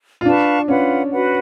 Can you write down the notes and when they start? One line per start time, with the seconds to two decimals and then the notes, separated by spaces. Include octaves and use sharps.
0.21 F4
0.25 D4 B4 F5 A5 C#6
0.68 C#4 F4 B4 F#5
1.11 F#4 B4 F#5